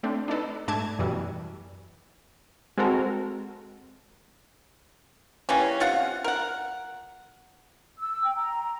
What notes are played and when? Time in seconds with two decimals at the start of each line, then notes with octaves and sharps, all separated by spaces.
0.03 A3 C4 D4
0.28 D4 D#4 A4 B4
0.68 G#2 A3 D4 A5 G#6
0.99 F#2 B2 E3 G3
2.78 G#3 C4 F#4 A4 A#4
5.49 E3 G3 A#3 C#4
5.80 C3 F4 F#5
6.24 A#4 F#5
7.99 E6
8.24 G5
8.37 A#5